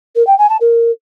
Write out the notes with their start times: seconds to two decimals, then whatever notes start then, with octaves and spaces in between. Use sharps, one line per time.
0.16 A#4
0.27 G5
0.38 G#5
0.49 A5
0.61 A#4